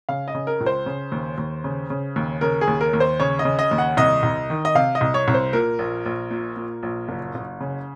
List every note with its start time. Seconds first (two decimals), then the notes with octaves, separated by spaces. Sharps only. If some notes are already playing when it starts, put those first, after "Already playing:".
0.09 C#3 F5
0.28 D#5
0.34 C#3
0.47 A#4
0.61 C#2
0.66 C5
0.86 C#3
1.12 D#2
1.38 D#2
1.64 C#3
1.90 C#3
2.16 D#2
2.41 C#3 A#4
2.61 G#4
2.68 D#2
2.81 A#4
2.94 D#2
3.00 C5
3.20 C#3 C#5
3.39 D#5
3.45 C#3
3.59 D#5
3.71 D#2
3.78 F#5
3.97 C2 D#5
4.23 C2
4.50 D#3
4.65 D#5
4.75 C3 F5
4.95 D#5
5.01 C2
5.14 C#5
5.28 C2
5.34 C5
5.53 A#2 A#4
5.79 A#1
6.06 A#1
6.31 A#2
6.56 A#2
6.83 A#1
7.09 F#1
7.35 F#1
7.60 C#3